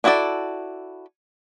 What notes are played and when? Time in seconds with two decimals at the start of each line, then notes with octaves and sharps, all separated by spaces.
0.04 D4 E4 F#4 A4 D5